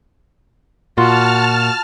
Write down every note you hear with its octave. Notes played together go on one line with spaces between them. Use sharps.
A#2 F4 F#4 A5 F6